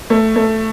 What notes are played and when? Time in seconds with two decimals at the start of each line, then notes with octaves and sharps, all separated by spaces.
0.10 A3
0.36 A3